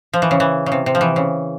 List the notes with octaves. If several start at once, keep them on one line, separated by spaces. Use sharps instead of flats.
F3
E3
C#3
E3
C#3
C3
C3
F3
E3
C#3